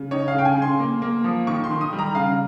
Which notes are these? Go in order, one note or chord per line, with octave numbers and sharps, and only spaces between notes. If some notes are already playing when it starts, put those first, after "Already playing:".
Already playing: C#3
D#4 C#5
F5
C#3 G5
G#5
C#3
C6
A#3
A#3
F3
D#3 C#6
C6
D#3
D#6
G3
A#5
C#3 F5